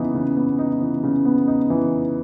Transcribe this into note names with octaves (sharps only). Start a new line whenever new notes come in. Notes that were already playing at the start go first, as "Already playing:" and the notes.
Already playing: C#3 E3 B3 D#4
C#3
B3
D#4
E3
C#3
B3
D#4
E3